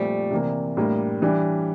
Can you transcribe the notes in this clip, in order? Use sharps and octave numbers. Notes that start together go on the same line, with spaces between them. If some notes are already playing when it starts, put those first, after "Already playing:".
Already playing: A#2 F3 G3 A3 C4
C3 E3 A#3
A2 G3 A#3 D4
E3 G3 D4